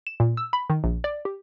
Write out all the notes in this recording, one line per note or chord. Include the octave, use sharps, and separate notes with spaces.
E7
A#2
E6
B5
D#3
A#1
D5
G4